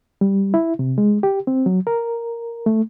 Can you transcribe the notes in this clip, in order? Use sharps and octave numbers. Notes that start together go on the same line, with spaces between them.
G3
E4
C3
G#3
G4
C4
F#3
A#4
A3